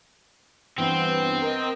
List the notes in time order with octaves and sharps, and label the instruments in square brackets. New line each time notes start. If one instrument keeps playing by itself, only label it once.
[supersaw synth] G2 E3 B3 [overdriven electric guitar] C4
[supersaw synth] A#4 D#5